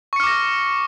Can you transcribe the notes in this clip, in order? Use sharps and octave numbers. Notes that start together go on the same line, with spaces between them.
C#6 D6 F6 A#6 C#7